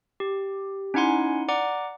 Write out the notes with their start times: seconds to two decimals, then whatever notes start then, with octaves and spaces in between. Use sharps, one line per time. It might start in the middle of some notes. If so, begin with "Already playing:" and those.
0.20 G4
0.94 C#4 D#4 E4 F#5 G#5 C6
1.49 D5 F#5 A#5 D6